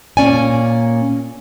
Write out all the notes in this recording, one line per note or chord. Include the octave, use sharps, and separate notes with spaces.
A#2 A#3 C#4 D5 G#5